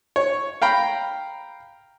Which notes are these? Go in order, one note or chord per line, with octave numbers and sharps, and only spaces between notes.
C#5
F5 G5 A#5 B5